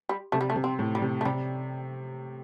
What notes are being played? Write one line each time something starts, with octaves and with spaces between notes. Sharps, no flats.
G3
C3 A3
G3
A3
C3
C4
A2
G3
C3
A3
C3 G3